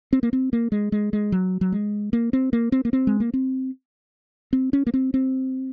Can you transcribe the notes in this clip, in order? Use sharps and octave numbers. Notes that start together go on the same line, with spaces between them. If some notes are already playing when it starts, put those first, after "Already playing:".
C4
A#3
C4
A#3
G#3
G#3
G#3
F#3
F#3
G#3
A#3
C4
A#3
C4
A#3
C4
G#3
A#3
C4
C4
C#4
A#3
C4
C4